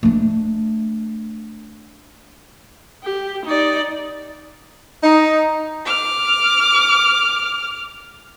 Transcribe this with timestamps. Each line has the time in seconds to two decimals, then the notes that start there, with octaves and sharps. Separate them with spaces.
0.03 A3 D4
3.04 G4
3.46 D#4 D5
5.03 D#4
5.85 D6 F6